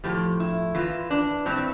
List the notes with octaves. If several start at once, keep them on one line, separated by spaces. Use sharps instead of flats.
A2 F3 G4
E4
E2 E3 F4
D4
G2 E3 C4